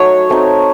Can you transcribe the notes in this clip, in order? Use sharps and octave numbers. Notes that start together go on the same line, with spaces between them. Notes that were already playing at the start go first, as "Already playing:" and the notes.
Already playing: F#3 A3 D#4 C#5
A3 C4 D#4